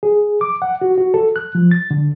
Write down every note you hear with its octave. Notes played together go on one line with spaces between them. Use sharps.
G#4
D6
F#5
F#4
F#4
A4
F#6
F3
A6
D3